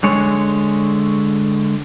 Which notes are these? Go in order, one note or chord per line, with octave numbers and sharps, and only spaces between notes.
D3 G#3 C#5